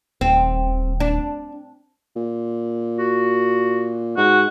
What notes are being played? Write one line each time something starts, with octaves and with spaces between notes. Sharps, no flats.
D#1 C4
D4
A#2
F#4
G#2 F#4